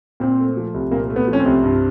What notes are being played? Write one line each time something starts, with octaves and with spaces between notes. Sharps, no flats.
A#2 C4
A3
F3
C2
A#2 A#3
A3
B3
F3
C#4
C4
C2
G2